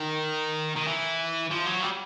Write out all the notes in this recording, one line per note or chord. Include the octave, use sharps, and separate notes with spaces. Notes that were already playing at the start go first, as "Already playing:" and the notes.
Already playing: D#3
D#3
E3
F3
F#3
G3